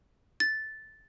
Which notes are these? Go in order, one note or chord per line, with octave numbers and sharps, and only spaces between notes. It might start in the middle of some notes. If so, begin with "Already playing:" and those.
A6